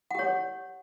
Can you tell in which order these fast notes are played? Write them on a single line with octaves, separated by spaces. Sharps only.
F#5 G4 C#5